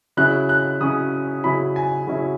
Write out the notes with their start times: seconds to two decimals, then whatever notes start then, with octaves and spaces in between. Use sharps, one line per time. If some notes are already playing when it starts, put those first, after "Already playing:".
0.17 C#3 F#3 C#4 E4 F#6
0.49 F#6
0.81 C#3 F#3 C#4 E4 D#6
1.44 C#3 F#3 C#4 E4 B5
1.76 G#5
2.07 C#3 F#3 C#4 E4